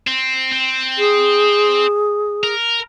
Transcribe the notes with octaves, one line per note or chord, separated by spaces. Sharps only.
C4
C4
G#4
A#4